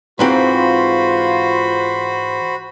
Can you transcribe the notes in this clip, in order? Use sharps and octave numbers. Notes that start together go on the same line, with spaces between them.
G#2 E3 C4 F4 F#4 C5 B5